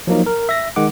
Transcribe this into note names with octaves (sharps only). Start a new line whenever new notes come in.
F3 F#3 A#3 D#4
A#4
E5 A#6
D#3 G#3 F#5 D6